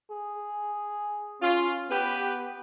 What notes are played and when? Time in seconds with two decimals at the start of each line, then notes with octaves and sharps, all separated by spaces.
0.11 G#4
1.41 C#4 F4
1.89 B3 G4 B4